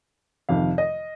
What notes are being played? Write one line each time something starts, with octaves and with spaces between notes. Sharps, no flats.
F2 C3 D#3 F5
D#5